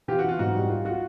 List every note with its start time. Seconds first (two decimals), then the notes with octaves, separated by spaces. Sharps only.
0.08 E3 F4 G4
0.19 F#4
0.24 E3 F4
0.39 G#2 F#4
0.55 G3
0.70 F4
0.85 F4 F#4